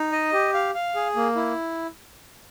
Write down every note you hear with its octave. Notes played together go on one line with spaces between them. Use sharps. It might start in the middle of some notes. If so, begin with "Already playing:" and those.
Already playing: D#4
D#5
G4
F5
F5
G#4
A#3
E4